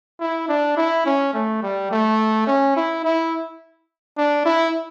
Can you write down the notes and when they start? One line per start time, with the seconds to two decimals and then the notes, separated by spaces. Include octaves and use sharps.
0.20 E4
0.48 D4
0.77 E4
1.06 C#4
1.33 A3
1.63 G3
1.91 A3
2.47 C#4
2.76 E4
3.04 E4
4.18 D4
4.45 E4